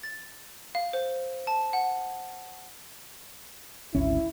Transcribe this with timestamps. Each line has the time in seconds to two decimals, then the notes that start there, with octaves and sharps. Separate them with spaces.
0.03 A6
0.75 F5
0.93 C5
1.47 A5
1.73 F#5
3.95 G#1 D2 C#4 E4